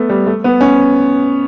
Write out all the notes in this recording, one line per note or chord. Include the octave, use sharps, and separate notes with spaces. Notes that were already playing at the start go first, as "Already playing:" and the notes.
Already playing: A3 B3
G3
A3
B3
C#4